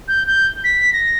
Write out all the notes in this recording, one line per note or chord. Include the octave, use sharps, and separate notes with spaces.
G6
G6
B6
A#6